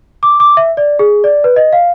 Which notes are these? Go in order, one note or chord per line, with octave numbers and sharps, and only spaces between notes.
D6
D6
E5
D5
G#4
D5
B4
D#5
F5